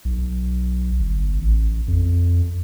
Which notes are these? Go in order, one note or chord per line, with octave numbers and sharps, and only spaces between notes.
B1
G1
A1
F2